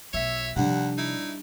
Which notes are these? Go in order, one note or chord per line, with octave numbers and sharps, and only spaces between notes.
B1 F4 C#5 E5
D#2 C3 F3 G3 D4 F#5
D#4 E4